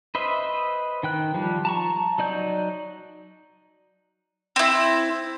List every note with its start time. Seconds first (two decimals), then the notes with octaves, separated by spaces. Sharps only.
0.15 B4 C5 D#5 E5
1.03 D#3 G5 F#6
1.34 F3 G3
1.65 A5 A#5 C#6
2.18 F#3 D#4 D5 G6
4.56 C4 E4